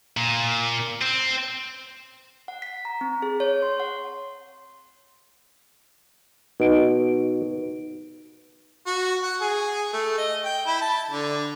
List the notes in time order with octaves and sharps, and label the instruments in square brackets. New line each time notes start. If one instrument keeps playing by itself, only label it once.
[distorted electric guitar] A#2
C4
[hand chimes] F#5
B6
A#5
C4
G#4
C#5
C6
F#5
[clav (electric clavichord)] B2 [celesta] D#4 B4 D7
[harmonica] F#4
F#5
G#4
A3
D#5
G5
E4
A5
D3